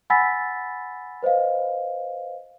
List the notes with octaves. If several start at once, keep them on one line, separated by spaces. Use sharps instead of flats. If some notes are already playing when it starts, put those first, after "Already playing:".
F#5 G#5 B5 E6 A6 B6
B4 C5 D#5 F5